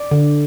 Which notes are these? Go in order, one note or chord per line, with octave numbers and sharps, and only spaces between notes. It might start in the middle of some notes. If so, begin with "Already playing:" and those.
Already playing: D5
D3